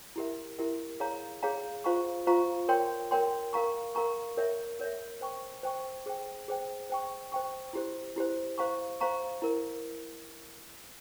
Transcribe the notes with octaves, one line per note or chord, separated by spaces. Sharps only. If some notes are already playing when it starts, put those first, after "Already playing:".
E4 G4 A#4 E5
E4 G4 A#4 E5
G#4 C#5 F5 A#5
G#4 C#5 F5 A#5
F4 C5 F5 A#5 C#6
F4 C5 F5 A#5 C#6
A#4 C#5 G5 C6
A#4 C#5 G5 C6
A#4 F5 A#5 C#6
A#4 F5 A#5 C#6
A#4 C#5 E5
A#4 C#5 E5
C5 G5 C#6
C5 G5 C#6
G#4 C5 G5
G#4 C5 G5
C5 G5 C#6
C5 G5 C#6
E4 G4 C5
E4 G4 C5
C5 F5 A#5 C#6
C5 F5 A#5 C#6
E4 A#4